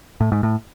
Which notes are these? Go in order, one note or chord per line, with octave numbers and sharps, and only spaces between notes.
A2
G#2
A2